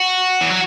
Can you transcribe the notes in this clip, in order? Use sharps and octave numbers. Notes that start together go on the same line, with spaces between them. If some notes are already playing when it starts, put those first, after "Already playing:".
Already playing: F#4
E3
F#3